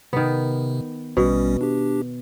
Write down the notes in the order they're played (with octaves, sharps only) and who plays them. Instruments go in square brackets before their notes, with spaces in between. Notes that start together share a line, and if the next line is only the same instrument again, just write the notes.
[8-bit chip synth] C3 [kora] D#3 B3
[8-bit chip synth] A#1 G3 C#4 [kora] B2
[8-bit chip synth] D4 G4